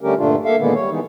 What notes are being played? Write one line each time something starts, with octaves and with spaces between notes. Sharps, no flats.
D3 G3 A3 C#4 G4 A#4
G2 A#2 D3 A3 D4 F4
A#3 A4 E5 F5
A#2 D3 D#3 G#3 A#3 B3
G3 C#5
D#3 E3 G#3 B3 D#4